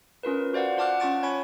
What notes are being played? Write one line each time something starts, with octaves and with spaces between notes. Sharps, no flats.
C#4 F4 A#4 B4
F#4 C5 D5 F5 F#5
F4 F#5 A5 D6 F6 F#6
C#4 F4 A5 C#6 A6 D7
C#5 G#5 B5 C#6 D7